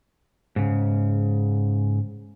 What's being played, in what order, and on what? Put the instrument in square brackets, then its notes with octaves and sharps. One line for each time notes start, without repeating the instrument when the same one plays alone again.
[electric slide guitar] G#2 C#3